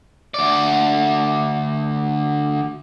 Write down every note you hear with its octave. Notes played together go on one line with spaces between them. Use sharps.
D2 D5